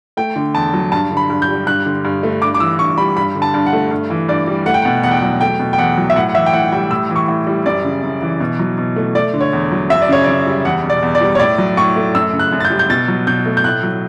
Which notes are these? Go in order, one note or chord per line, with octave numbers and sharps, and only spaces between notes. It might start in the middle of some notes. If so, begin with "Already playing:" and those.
A3 G5
D3
E2 A5
F#3
G2 A5
D3
B5
G2
G6
G3
G2 F#6
D3
G2
A3
G2 D6
D6
E3 E6
G2 C#6
G3 B5
G2 B5
D3
A5
G2
F#5
A3
G2
E3
G2 D5
G3
A3 F#5
G5
F#5
B2
E2 F#5
G5
F#5
F#3
A3 G5
B2
G5
E2 F#5
F#3
E5
A2 F#5
F#5
E3 E5
G5
A2 F#5
G3 G5
A2 E6
E3
C#6
A2
G3
F#2 D5
C#3
F#2
E3
B2
F#3
B2
A3
A3 D5
D3
C#5
E2
F#3
F#2 E5
D5
C#3 C#5
F#2 D5
G3
E2 F#5
B2
D5
E2
D5
G3
C#5
A2 D5
F#3
A2 C#6
A3
F#2 E6
C#3
F#6
F#2
A6
G6
G3
G6
B2 A6
F#3
B2 G6
A3
G6
A2 F#6
F#3